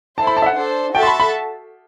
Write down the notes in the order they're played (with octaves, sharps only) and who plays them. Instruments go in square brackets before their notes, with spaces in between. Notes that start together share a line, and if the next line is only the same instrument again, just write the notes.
[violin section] E4 A4 C5 [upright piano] A5
[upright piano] B5
A5
E5
F#5
[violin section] D4 A4 C5
[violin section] F#4 A4 E5 A5 [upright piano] G5
[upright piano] C6
B5
B5